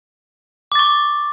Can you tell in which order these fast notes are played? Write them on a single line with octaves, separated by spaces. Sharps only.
D6 A6 C#6